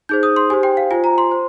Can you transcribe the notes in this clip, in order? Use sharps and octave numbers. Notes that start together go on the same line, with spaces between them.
D#4 G#4 C5 G6
D#6
C6
G4 C5 G#5
G5
F5
F4 C5 G#5
A#5
C6
C5